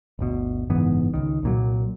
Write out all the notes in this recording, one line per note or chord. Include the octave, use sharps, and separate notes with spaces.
G1 D2 B2
F#1 G#2 E3 B3
C#2 D#3
C2 A#2 F#3